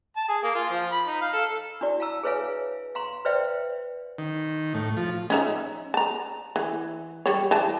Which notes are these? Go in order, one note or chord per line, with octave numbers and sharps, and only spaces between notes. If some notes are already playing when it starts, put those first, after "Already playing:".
A5
G#4
A#3
F4
F3
B5
D#4
F5
A4
D4 E4 F#4 D5
F5 A5 A#5 E6
G#4 B4 C#5 E5 F5 G#5
F5 A#5 C6
B4 C5 D5 E5 F5 G5
D#3
A2
F3
C#4 D#4 E5
A5 A#5
E3
G3 C#5
E3 A5